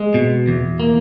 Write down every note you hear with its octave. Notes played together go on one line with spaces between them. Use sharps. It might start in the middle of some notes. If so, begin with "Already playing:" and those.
Already playing: G#3
B2
E2
A#3